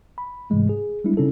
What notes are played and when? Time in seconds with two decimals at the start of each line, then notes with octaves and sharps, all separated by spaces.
0.18 B5
0.50 G#2 C3 E3 G#3 A3
0.69 G#4
1.04 G3 G#3 B3 D4 E4
1.17 C#3 C#4 D#4 E4 A4